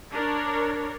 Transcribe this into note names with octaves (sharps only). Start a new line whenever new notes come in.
D4 A#4 C#5